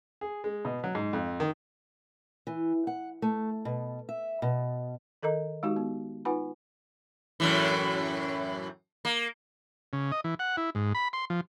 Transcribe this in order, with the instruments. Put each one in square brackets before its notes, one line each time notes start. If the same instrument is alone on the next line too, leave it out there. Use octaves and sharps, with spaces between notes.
[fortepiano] G#4
G#3
B2
F#3
G#2
F2
D#3
[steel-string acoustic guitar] E3
F#5
A3
B2
E5
B2
[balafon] D#3 A4 A#4 D#5 A#5
G#3 D#4 F#4 G4
B3
D#4 F4 B4 F#5 G#5 B5
[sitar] F#2 A2 E3
A#3
[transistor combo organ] C#3
D#5
E3
F#5
E4
G#2
B5
C6
F3